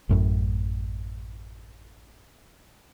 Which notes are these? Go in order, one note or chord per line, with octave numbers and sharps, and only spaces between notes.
A1 F#2 A2